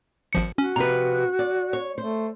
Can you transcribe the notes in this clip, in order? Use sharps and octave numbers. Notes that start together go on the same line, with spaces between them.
G#1 F3 C#7
C#4 F#4
C3 F3 B4 A#5
D5
C#5
A3 C5